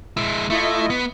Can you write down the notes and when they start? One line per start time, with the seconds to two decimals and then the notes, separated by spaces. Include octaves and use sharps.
0.17 G#3 E4
0.50 A3 E4 F4 D#5
0.90 B3